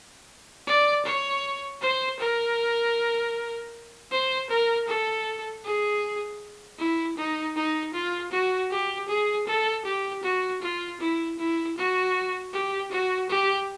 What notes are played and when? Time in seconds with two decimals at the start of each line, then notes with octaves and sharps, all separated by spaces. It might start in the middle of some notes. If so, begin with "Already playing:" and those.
0.67 D5
1.06 C#5
1.81 C5
2.20 A#4
4.11 C5
4.50 A#4
4.87 A4
5.64 G#4
6.79 E4
7.17 D#4
7.56 D#4
7.93 F4
8.32 F#4
8.71 G4
9.08 G#4
9.47 A4
9.86 G4
10.23 F#4
10.62 F4
11.01 E4
11.39 E4
11.77 F#4
12.53 G4
12.91 F#4
13.30 G4